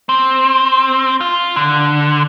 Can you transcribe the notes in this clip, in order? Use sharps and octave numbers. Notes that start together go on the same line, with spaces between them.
C4
F4
D3